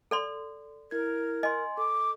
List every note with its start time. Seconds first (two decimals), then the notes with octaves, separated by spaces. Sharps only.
0.11 A4 D5 C6
0.91 E4 A#4 G#6
1.43 D#5 G#5 C6
1.77 A4 D6